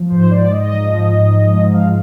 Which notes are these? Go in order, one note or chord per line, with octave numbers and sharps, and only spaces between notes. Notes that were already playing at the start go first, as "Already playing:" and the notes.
Already playing: F3
G#2 C5
G#2 D5
G#2 D#5
F3
G#2
G#2
F3
G#2
F3 F5